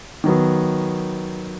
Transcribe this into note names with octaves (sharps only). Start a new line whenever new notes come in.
D#3 F#3 B3